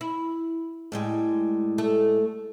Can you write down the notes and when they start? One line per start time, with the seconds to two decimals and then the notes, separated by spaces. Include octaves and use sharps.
0.01 E4
0.92 A2 G3 G#3
1.78 A3 A4